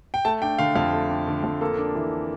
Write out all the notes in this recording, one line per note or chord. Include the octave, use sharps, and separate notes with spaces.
G5
A3 A5
D4 G5
D3 F5
F2 F5
A3
D4
D3
F2
A#3 A4
D4
E3